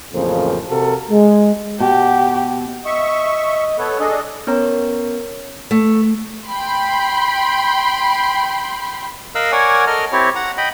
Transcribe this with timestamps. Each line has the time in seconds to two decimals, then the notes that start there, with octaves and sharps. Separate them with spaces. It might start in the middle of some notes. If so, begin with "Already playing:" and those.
0.13 A1 F2 C#3 A#3 A4 C5
0.70 C3 F#4 A4 A#4
1.10 G#3
1.80 B2 G4
2.86 D#5 E5 C#6
3.79 B3 A4 C#5
4.00 D4 G#4 A4 D#5
4.47 B3 C#4 A#4 C#5 A#5
5.71 A3
6.47 G5 B5 C6
9.35 A#4 D#5 F5 E6 F#6
9.52 A#4 C#5 D5 F#5 G#5
9.87 A4 A#4 D#5 F6
10.12 C4 E4 G4 C#5
10.35 F#5 A#5
10.58 D#5 G5 B5